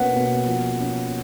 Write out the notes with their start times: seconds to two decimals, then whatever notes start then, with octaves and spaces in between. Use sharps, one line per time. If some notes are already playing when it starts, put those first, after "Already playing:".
Already playing: B2 A#3 C#4 B4 F#5
0.13 B2
0.46 F3
0.79 C#4